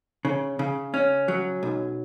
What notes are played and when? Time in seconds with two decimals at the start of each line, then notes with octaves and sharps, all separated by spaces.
0.25 C#3
0.59 C#3
0.94 C#4
1.28 F#3
1.63 B1